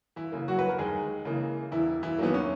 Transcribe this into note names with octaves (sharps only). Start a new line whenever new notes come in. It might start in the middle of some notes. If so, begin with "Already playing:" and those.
E3 E4
C#3 E3 A#3
F#3 F#4
B4
A#4
D#2 G#3 G#4
C#3 E3 A#3
E1 E3 E4
E3 E4
E2 D#3 F#3 A#3 B3
C#4